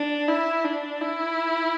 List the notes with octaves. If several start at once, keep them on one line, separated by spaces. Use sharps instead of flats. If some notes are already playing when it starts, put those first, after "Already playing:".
Already playing: D4
E4
D4
E4